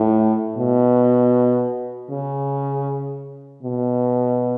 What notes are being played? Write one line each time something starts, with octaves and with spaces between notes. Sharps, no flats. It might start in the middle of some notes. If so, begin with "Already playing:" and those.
Already playing: A2
B2
C#3
B2